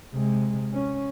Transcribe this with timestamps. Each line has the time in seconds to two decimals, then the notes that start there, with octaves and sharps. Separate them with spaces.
0.13 C3 G#3
0.72 C#4